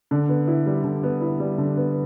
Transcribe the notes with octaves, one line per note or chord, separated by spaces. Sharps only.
D3
B3
E4
G3
D3
B3
E4
G3
D3
B3